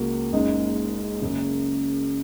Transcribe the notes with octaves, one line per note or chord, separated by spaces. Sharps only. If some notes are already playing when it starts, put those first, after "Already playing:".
Already playing: C#2 C#3 A#3 F#4
F#1 F#2 C#3 G#3 D#4
F#1 F#2 C#3